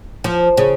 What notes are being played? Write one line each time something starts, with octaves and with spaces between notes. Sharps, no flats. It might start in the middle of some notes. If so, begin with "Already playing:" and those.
F3
C#3